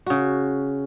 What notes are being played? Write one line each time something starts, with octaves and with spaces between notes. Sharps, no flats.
C#3 F#4